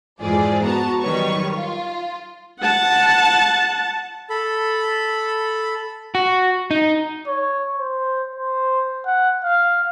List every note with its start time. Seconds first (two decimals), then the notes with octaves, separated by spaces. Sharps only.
0.20 F2 G#2 E3 F3 G#4 D5
0.64 B3 F#4 A5 A#5
1.02 D#3 F#3 G3 B4 C#5 C#6
1.55 F4
2.61 F#5 A5
4.30 A4 B5
6.15 F#4
6.71 D#4
7.27 C#5
7.78 C5
8.36 C5
9.06 F#5
9.44 F5